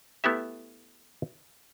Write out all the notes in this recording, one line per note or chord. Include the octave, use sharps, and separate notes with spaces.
A3 B3 E4 G4 E5